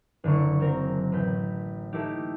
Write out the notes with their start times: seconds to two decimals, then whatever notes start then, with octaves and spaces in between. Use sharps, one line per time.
0.24 F#1 D3 A#3 C#6
0.60 F#3 C4 A#4
1.12 A1 B5 G6
1.93 A3 A#3 D#4 E4 G4